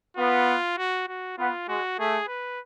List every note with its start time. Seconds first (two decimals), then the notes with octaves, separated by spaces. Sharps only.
0.17 B3 F4
0.78 F#4
1.09 F#4
1.38 B3 F4
1.68 G#3 F#4
1.99 A3 G#4
2.28 B4